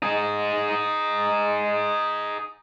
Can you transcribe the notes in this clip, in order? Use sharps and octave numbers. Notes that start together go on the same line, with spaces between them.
D#4 G#4